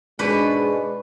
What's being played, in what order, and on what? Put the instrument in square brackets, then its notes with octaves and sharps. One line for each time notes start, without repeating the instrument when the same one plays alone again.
[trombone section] G#2 G#3 [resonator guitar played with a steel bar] B2 D4 [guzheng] B4